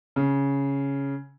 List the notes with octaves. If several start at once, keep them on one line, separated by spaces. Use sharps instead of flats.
C#3